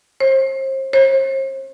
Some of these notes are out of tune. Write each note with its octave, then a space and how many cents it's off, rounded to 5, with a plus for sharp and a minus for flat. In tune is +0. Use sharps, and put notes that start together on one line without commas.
C5 +35
C5 +45